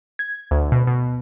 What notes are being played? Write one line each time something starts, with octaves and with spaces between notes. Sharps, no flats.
G#6
D2
B2
B2